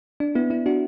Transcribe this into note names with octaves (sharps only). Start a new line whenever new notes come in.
D4
B3 E4
B3 E4
D4 F#4